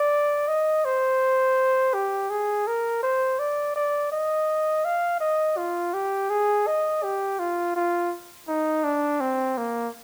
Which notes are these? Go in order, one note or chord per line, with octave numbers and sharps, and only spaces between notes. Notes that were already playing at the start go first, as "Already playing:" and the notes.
Already playing: D5
D#5
C5
G4
G#4
A#4
C5
D5
D5
D#5
F5
D#5
F4
G4
G#4
D#5
G4
F4
F4
D#4
D4
C4
A#3